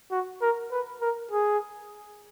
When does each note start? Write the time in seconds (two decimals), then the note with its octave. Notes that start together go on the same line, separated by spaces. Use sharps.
0.11 F#4
0.42 A#4
0.71 B4
1.01 A#4
1.31 G#4